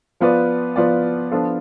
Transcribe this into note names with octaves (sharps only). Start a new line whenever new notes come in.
F3 B3 F4 B4 D5
F3 B3 F4 B4 D5
F3 B3 D4 F4 A4